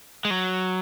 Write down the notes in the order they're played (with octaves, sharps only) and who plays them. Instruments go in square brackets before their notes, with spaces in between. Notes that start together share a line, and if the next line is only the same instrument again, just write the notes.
[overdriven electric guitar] G#3
F#3